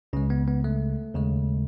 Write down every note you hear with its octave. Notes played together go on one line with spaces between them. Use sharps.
C#2 C#3 G#3 C#4
B3
B3
A3
D#2 C#3 G#3